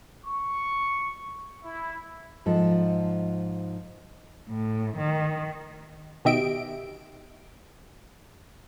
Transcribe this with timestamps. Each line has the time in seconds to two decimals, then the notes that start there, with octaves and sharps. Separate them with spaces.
0.25 C#6
1.63 E4
2.46 G#2 F3 A4
4.49 A2
4.97 D#3
6.25 B2 D#3 G4 D#5 E5 D7